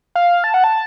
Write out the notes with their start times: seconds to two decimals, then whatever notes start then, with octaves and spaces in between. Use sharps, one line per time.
0.15 F5
0.44 A5
0.54 F#5
0.64 A5